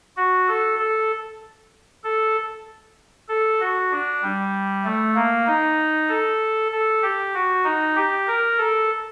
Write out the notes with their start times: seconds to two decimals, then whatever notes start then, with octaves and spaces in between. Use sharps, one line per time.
0.17 F#4
0.48 A4
0.79 A4
2.04 A4
3.29 A4
3.60 F#4
3.91 D4
4.22 G3
4.84 A3
5.15 A#3
5.47 D#4
6.09 A4
6.72 A4
7.02 G4
7.34 F#4
7.64 D#4
7.96 G4
8.27 A#4
8.58 A4